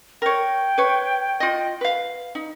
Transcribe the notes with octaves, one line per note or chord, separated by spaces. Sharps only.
A#4 C#5 G5
B4 C#5
F4 D#5
B4 F5
D#4